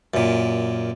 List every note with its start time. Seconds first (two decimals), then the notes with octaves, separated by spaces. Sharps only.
0.14 F#2 A#2